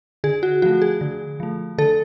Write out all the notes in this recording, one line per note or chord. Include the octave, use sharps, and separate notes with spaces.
D3 G#4
F#4
F3 A3 F#4
G#4
D3
F3 A3
D3 A4